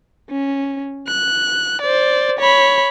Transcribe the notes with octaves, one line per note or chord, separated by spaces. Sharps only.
C#4
F#6
C5 D5
C#5 B5